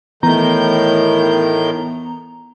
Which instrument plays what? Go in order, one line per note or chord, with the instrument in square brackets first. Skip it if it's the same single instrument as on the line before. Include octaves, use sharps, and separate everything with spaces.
[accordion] A2 D#3 G6 [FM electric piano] E3 B3 A#5